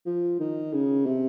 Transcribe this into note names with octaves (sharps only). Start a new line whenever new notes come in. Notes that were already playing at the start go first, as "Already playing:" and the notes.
F3
D#3
C#3
C3